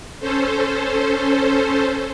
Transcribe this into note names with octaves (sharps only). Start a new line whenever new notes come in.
C#4 A4 C5